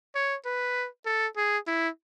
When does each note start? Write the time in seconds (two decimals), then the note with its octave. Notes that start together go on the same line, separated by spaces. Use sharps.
0.15 C#5
0.45 B4
1.06 A4
1.36 G#4
1.67 E4